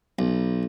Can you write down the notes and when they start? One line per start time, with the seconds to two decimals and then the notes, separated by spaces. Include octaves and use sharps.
0.19 B1